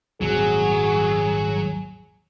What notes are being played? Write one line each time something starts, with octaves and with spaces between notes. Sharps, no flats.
D#1 G#1 C3 F#3 G#4